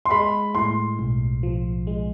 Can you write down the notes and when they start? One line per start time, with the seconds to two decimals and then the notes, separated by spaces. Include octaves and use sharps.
0.05 C6
0.11 G#3 B5
0.55 A2 C6
0.99 B1
1.43 F3
1.87 G#3